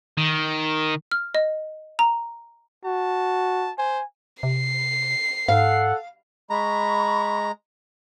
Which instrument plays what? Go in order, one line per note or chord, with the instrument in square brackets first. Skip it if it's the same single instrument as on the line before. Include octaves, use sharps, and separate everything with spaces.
[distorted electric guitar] D#3
[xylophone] F6
D#5
A#5
[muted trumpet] F#4 [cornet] A5
[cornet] C5 [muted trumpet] G#5
[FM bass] C3 [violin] C7
[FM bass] G#2 [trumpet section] A4 F#5 [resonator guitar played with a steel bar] F5
[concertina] G#3 A#5 [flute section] B5 C#6